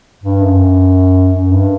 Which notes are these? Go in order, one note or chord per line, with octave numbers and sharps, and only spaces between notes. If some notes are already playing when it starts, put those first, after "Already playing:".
G2
F#2
F#2
G2